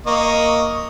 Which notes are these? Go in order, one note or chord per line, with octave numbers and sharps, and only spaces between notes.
A#3 D#5 C#6